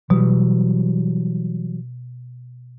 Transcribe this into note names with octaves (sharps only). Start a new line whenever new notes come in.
B2 E3 F#3 G3